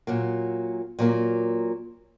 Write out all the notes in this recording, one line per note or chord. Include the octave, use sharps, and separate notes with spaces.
A#2 F#3 A#3
A#2 F#3 A#3